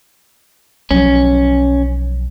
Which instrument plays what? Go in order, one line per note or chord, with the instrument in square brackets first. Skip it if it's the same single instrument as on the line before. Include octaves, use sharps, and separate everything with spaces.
[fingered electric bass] B1 F3 F#3 [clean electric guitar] C#4